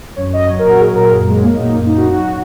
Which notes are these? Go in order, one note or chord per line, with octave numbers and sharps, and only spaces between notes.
F#2 C#5
F#3 D#5
F#3 C#5
A#4
A#2 F#4
F#3 G#4
A#2 A#4
F#2 G#4
F#3 G#3
F#3 A#3
D#4
A#2 A#3
F#2 A#3
D#4
F#3
F#4
F#3